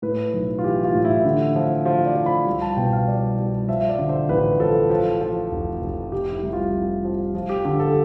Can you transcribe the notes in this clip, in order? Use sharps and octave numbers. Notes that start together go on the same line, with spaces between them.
A2 B4
B1
F4
E3 G4
F4
A2
E4
D3
F3
F3 F4
D5
F3
B5
C2
A5
B2 G5
F5
C2 D5
C2
F3 E5
D5
D3
C5
A1 B4
F3 A4
F3
F3
F1
F1
C3 G4
E4
C2
F4
C2
F3
F3
G4
D3 G4
A4